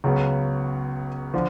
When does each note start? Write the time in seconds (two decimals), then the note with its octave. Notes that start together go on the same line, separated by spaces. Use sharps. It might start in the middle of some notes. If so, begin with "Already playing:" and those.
0.04 C#2 C#3 F#3 B3
1.34 D3 F3